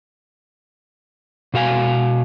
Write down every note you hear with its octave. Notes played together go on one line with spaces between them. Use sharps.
B2 F#4 F5 G#5